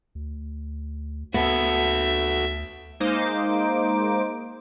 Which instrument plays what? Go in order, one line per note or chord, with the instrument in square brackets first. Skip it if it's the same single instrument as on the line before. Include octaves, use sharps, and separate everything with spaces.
[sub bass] D2
[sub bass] D2 [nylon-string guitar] B3 [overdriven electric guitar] F#4 A4 [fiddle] E5
[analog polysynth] G#3 A#3 D#4 C5 D6